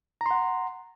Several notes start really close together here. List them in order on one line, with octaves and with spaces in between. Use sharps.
A#5 C6 F#5